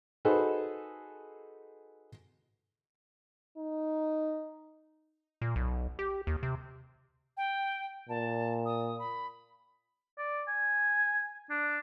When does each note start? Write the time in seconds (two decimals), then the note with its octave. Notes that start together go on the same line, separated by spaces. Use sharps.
0.25 D#4 F#4 G#4 A4 B4 C5
3.58 D#4
5.42 A#2
5.56 B1
5.99 G4
6.27 D#2
6.43 C3
7.37 G5
8.09 A#2 A5
8.66 D#6
8.99 B5
10.18 D5
10.48 G#5
11.50 D4